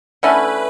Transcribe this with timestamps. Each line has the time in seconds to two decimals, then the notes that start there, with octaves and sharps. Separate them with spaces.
0.23 D3 A3 C#4 E4 B4